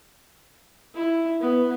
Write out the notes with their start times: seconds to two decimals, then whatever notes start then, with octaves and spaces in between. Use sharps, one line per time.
0.95 E4
1.41 B3